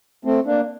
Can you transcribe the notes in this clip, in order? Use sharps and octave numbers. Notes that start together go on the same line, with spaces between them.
A3 C4
A#3 D4